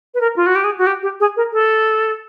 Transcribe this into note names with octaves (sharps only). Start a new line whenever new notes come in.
B4
A#4
F4
F#4
G4
G#4
F#4
G4
G4
G#4
A#4
A4